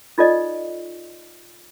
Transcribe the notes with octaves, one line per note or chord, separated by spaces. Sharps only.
D#4 F4 A4 D5 D#5